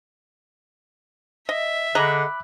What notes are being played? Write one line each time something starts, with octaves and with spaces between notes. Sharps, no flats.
D#5 E5
D3 G#4 D#5 A#5 B5 D6 F#6